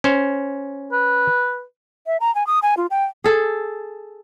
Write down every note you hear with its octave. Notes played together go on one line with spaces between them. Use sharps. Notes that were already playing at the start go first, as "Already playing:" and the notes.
C#4 C5
B4
E5
A#5
G#5
D#6
G#5
F4
G5
G#4 A4